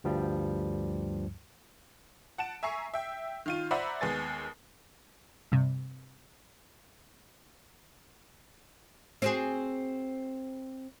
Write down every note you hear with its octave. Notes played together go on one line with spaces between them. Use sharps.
D2 G2 F3 G3
F#5 A5 D7 E7
E5 G#5 A#5 C#6 C7
E5 G5
D#3 F4 D#7
C5 D5 E5 F#5 A#5 B5
D#2 G#3 B3 G#5 A6
G2 C3
C4 F#4 G#4